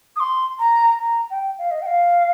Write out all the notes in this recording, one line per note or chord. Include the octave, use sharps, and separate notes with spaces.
D#6
C6
A#5
A#5
G5
F5
D#5
G5
F5